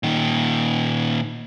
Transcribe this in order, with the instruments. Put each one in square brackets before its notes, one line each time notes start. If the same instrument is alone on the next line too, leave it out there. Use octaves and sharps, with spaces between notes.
[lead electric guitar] A#2 D#3